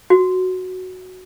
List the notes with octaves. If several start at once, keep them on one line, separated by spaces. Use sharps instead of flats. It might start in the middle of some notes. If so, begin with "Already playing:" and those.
F#4